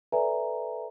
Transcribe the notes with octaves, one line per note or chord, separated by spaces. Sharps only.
A4 B4 D5 E5 G#5 A#5